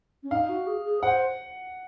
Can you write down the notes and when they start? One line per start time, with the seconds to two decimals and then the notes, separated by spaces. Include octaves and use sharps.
0.23 C#4
0.31 D#4 F5
0.49 F#4
0.67 G#4
0.85 G#4
1.02 C5 F#5